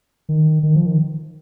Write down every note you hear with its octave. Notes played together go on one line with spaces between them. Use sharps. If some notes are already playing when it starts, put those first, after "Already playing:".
D#3
D#3
F3
D#3